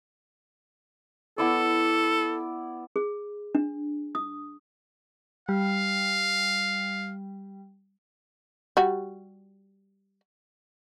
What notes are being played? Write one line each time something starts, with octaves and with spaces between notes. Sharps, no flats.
B3 E4 A4 D5
G#4
D4
D#6
G3 F5
G3 F#4